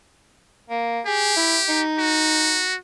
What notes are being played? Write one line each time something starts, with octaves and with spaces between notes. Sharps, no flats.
A#3
G4 G#4
E4
D#4
F#4